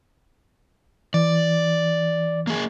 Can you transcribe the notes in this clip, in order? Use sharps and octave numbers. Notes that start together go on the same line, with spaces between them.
E3 D5
A#3 G#4